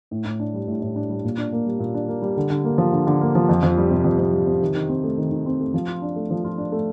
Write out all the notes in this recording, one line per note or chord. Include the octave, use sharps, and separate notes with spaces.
A2
A2
D4
G3
A2
A2
D4
G3
A#2
D4
A#3
G3
A#2
D4
A#3
G3
D3
D3
A#3
F3
D3
D3
A#3
F3
F2
F2
G3
C3
F2
F2
G3
C3
D#3
D#3
C4
A3
D#3
D#3
C4
A3
F3
F4
D4
A3
F3
F4
D4
A3